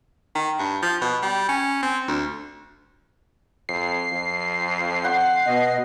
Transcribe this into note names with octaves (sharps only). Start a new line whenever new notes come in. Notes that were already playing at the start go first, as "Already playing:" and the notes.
D#3
G2
F3
B2
G3
C#4
C4
D2
F2 C7
F2
F#5 G5 C6
B2 D#5